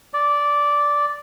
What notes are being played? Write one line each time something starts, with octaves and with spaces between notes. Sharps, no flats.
D5